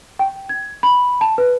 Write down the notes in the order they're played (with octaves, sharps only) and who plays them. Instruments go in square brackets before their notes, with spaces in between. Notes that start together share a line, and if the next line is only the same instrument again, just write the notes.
[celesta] G5
G#6
B5
A5
B4